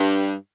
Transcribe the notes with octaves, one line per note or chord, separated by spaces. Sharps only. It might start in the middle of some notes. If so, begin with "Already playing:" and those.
Already playing: G2